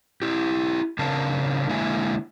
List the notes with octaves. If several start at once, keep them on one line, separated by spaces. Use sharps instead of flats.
E4 G4
C#3 C4 D4 A#4 F5 A5
D3 G#3 A#3 E4 E5 G#5